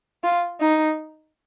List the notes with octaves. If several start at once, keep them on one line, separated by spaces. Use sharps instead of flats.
F4
D#4